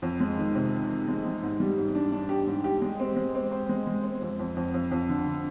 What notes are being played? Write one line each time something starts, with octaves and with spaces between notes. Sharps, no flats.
F2
G#3
D#3
C3
D#3
D#3
G#3
G#3
G#2
G3
G#2
D4
D4
G4
G#2
G4
G#3
C4
G#3
C4
C5
G#3
G#3
C4
F2
F2
F2
F2
F2
D3
D3